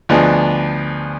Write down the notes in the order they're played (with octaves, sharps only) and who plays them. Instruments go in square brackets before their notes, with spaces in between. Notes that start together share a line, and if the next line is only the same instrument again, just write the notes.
[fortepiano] D2 F3 B3 D4 G#4 D#5